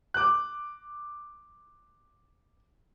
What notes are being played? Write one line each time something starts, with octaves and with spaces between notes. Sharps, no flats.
D6 F#6